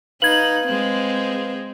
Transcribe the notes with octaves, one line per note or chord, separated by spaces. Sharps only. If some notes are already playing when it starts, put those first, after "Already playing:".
D#4 B4 F5 G#6 F#7
G#3 C4